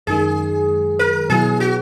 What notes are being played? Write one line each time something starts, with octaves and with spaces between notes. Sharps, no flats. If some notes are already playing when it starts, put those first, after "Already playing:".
F#2 D#3 G#3 G#4
A#4
B2 F#3 B3 E4 G#4
F#4